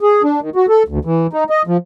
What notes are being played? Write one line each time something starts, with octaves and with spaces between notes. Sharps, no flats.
G#4
D4
D#3
F#4
A4
D2
E3
D#4
D#5
F3